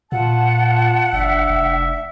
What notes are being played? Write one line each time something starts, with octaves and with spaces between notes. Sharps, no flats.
A#2 F4 F#5 A5
F#1 D4 E5
F1